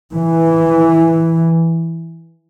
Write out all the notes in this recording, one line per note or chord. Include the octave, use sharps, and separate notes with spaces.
E3